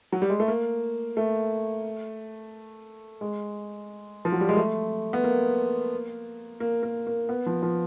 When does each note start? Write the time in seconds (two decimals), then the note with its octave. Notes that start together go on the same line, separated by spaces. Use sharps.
0.12 F#3
0.22 G3
0.30 G#3
0.40 A3
0.48 A#3
1.17 A3
3.21 G#3
4.25 F3
4.32 F#3
4.41 G3
4.49 G#3
4.56 A3
5.13 B3
5.24 A#3
6.60 A#3
6.83 A#3
7.07 A#3
7.29 B3
7.46 F3
7.62 F3